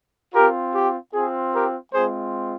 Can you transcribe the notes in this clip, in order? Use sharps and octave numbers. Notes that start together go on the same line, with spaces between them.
C4 F4 G4 A#4
G4
C4 F4 G#4
G4 A#4
G#3 C4 F4 G#4 C5